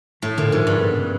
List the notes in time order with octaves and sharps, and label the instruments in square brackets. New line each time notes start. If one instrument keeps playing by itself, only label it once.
[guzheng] A2 [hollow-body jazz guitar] A3
[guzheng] A#2 [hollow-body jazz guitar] D3
[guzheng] G#2 [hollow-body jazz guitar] F3
[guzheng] G2 [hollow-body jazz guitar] D4
[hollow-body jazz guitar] B3
C#3